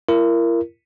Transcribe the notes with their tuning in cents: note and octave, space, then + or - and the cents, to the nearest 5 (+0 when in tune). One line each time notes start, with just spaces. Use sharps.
E4 +45 A#4 -5